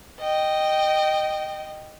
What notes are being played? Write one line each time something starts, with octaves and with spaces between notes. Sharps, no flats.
D#5 G5